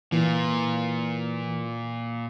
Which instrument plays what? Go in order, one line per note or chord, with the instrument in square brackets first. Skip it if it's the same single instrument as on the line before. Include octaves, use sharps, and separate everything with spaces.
[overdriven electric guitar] A#2 [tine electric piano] E3